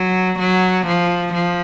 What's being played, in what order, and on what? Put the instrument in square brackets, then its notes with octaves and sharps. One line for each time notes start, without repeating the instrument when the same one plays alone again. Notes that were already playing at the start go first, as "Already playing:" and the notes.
Already playing: [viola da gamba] F#3
F#3
F3
F3